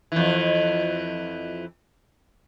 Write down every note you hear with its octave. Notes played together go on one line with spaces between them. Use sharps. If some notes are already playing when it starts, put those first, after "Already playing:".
F2 E3